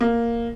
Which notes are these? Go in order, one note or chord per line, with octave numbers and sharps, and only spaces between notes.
A#3